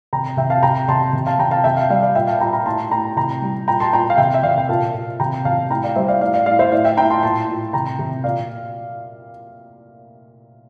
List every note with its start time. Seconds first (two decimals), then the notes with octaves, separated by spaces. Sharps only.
0.13 C3 G5 A#5
0.37 C3 E5 G5
0.50 F5 A5
0.63 C3 G5 A#5
0.88 C3 A5 C6
1.13 C3
1.27 F5 A5
1.39 C3 G5 A#5
1.51 F5 A5
1.64 C3 E5 G5
1.77 F5 A5
1.90 G3 D5 F5
2.02 D5 F5
2.15 A#2 E5 G5
2.27 F5 A5
2.40 A#2 G5 A#5
2.53 G5 A#5
2.66 A2 A5 C6
2.91 A2 G5 A#5
3.17 C3 G5 A#5
3.42 G3
3.68 A#2 G5 A#5
3.80 A5 C6
3.93 A#2 G5 A#5
4.10 F5
4.18 C3 E5 G5
4.34 E5
4.43 C3 D5 F5
4.58 G5
4.69 A#2 F5 A5
4.94 A#2
5.20 C3 G5 A#5
5.45 C3 F5 A5
5.70 A2 G5 A#5
5.83 D5 F5
5.96 G3 C5 E5
6.08 D5 F5
6.21 A2 D5 F5
6.34 D5 F5
6.46 A2 D5 F5
6.59 C5 E5
6.72 A2 D5 F5
6.84 E5 G5
6.97 A2 G5 A#5
7.10 A5 C6
7.23 A#2 A5 C6
7.48 A#2
7.73 C3 G5 A#5
7.99 C3
8.24 A#2 D5 F5